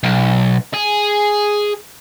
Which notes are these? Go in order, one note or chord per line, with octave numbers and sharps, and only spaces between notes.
B1
G#4